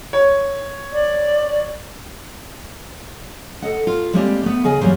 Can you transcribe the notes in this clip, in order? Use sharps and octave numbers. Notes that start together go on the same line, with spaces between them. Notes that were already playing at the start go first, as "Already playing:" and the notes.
C#5
D5
A4 D#5 F#5
F4
G3 G#3 A#3 C4 G4 D5
A3 B3
C#3 G#4 D#5 G#5
F#2 E3 F#3 G3 A#3 C5